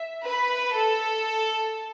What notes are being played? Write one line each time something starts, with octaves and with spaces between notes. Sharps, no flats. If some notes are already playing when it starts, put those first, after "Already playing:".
Already playing: E5
B4
A4